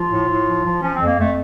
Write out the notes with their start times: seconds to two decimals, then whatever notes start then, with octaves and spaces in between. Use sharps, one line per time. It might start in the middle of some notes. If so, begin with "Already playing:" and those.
Already playing: F3 F4
0.11 A2
0.28 A2
0.46 F3
0.64 F3
0.82 F3 C#4
0.94 C4
1.00 F2
1.06 A#3
1.18 F2 A3